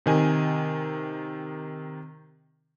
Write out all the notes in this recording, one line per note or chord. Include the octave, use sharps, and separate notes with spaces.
C3 D#3 G#5